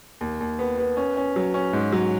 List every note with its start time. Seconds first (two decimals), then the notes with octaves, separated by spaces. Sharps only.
0.21 D#2
0.40 D#2
0.59 B3
0.78 B3
0.97 C#4
1.17 C#4
1.36 F#3
1.54 C#4
1.73 G#2
1.92 F#3